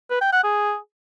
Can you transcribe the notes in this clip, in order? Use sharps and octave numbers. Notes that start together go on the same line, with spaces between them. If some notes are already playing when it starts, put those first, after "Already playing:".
B4
G5
F#5
G#4